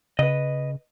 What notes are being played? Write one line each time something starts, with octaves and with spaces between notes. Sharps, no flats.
C#3 B4 D#5